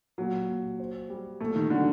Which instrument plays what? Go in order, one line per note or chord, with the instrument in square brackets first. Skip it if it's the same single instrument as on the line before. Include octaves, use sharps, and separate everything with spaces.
[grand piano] A#2 [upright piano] F#3
[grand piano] A#2
C5
G3
[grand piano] A#2 [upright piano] A3
[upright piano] D#3
[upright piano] D3 [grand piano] F#3